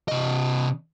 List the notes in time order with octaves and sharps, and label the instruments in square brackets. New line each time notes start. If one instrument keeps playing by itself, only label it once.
[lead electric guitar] C3 D#5